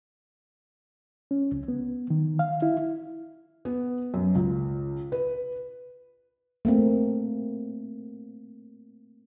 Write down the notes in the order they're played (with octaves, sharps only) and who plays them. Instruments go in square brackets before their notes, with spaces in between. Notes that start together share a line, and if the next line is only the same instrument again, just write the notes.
[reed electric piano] C#4
C#2
B3
D#3
F5
E4
[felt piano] B3
F#2
C#2
B4
[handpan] A3 A#3 C4